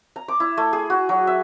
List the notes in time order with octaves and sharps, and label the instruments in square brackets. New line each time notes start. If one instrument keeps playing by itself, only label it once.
[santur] A#5
D6
E4
A3
G#4
F#4
F#3
E5